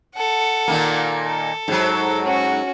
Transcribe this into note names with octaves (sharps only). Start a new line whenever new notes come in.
A4 F#5
A#2 D#3 A#3
A4
G#2 F#3
C#4 F#4